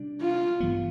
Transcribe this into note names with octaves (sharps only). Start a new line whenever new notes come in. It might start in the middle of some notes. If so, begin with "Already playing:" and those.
Already playing: C3 G3 D4
F4
G2 E3 G3 B3